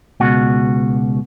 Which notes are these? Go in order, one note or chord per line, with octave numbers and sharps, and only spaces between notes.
C#2 B2 F#4